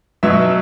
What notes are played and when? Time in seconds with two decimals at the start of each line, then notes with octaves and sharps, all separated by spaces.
0.23 B2 F#3 E5